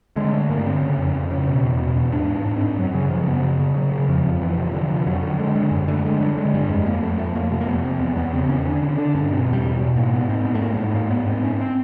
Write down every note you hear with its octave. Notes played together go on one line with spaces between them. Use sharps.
D3 G#3
D3 A3
G2 A#3
D3 C4
C#3
F2
F2
C#3
B2
E2
B2
E2
G#2 D4
G#2
D4
G#2
C4
G#2
F#2 F#3
C#3 F#3
C#3 F3
F#2 B3
C#3
C#3
C#3 F#3
C#3
F2 F3
F2
F2 E3
C3
D3 F3
D3
F2 F#3
D3
D3 G#3
D3 G#3
F#2
D3 A3
D3 G#3
D3 G3
D3 G#3
G2 G3
F2 G#3
F2 A#3
F2 A3
F2 A3
F2 A#3
C3 A3
A#3
F2 B3
F2 C4
E2 B3
E2 B3
C#3 C4
E2 C#4
D3 D4
D3 C#4
D3 D4
G2 C#4
B2 C4
E2
G3
B2
B2
G#2 A#3
G#2 B3
G#2 C4
G#2 B3
A3
G#2 A#3
G#3
G#2 A3
G#2 A#3
G#2 B3
G#2 C4
G#2 C#4
C4